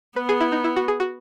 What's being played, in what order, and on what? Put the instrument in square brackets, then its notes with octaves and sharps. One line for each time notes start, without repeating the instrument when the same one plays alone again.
[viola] B3 [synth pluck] B4
[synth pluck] G#4
E4
D#4
E4
F#4
G#4
F#4